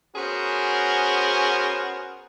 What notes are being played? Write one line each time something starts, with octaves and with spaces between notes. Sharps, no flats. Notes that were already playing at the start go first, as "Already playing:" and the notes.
B3 C#4 F#4 G#4 A#4 C5